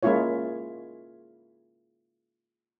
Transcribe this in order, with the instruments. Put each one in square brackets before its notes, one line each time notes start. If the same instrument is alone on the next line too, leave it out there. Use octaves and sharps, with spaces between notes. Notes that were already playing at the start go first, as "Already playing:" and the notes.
[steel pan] G#3 A#3 C#4 E4 F4 C#5